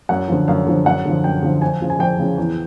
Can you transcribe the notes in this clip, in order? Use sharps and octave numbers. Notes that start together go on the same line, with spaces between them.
F#2 F#5
D3 F3
F#2 F5
D3 F3
F#2 F#5
D3 F3
F#2 G5
D3 F3
F2 G#5
C#3 F3
G#5
F2 G5
C#3 F3
E2